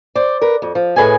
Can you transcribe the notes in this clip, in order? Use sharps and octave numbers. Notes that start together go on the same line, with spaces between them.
C5 D5
A#4 B4
F2
F3
A2 G#4 B4 D#5 G#5